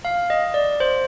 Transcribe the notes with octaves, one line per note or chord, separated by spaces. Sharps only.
F5
D#5
D5
C5